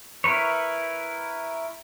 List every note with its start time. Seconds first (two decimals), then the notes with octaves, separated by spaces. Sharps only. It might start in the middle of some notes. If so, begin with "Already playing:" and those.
0.24 E4 A#4 B4 C#5